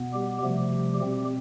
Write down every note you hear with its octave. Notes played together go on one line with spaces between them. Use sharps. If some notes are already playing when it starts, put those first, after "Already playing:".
Already playing: B2 B3
G3 G4
C3 F3 G3 A3 G4
B2 G3 C4 G4